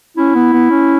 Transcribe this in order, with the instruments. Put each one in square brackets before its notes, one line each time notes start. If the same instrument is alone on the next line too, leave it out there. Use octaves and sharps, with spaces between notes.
[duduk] C#4 [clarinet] E4
[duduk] B3
B3
C#4